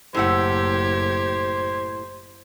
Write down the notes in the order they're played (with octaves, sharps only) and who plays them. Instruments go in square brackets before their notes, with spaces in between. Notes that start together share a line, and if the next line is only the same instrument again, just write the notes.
[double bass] F#1 [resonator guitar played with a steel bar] A2 E4 F#5 [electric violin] G4 G#6 [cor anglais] C5